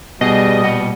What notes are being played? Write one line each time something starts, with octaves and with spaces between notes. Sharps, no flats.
B2 G3 B3 G#4 D#5
A#2 F#5